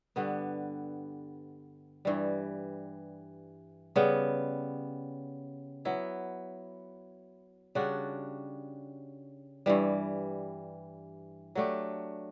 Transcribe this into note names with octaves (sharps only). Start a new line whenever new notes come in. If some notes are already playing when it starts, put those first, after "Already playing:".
G2 D3 G3 B3
G2 E3 G3
C#3 G3 B3
F#3 B3 E4
C#3 G3 D4 F#4
G2 E3 G3
F#3 A3 D4 G4